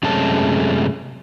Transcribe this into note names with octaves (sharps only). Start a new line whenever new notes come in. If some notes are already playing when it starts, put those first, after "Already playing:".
F#2 C3 G#3 A3 C#4 A5